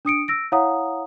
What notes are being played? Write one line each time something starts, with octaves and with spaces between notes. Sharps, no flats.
D4 D#6 C#7 D7
E6 A#6 D7
E4 C#5 F5 F#5 A#5 D#6